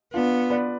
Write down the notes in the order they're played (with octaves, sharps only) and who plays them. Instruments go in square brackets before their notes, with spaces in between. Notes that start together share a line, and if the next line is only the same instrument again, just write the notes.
[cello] B3 [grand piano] D4 F4
[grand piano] B4 D5